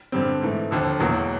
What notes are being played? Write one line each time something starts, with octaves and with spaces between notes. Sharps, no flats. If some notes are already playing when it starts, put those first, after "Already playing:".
G2 D3 G3 C4
G#2 E3 A3
D#2 D3 F3
E1 E2 B2 F#3 A#3